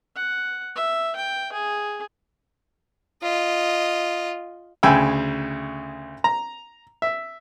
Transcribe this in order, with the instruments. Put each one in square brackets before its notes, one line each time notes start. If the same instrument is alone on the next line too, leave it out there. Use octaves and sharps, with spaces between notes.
[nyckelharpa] F#5
E5
G5
G#4
[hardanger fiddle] F4 D#5
[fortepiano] D2 C#3 G5 G#5 B5 E6
A#5
E5